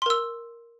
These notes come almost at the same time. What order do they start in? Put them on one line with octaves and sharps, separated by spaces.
C6 A#4 E6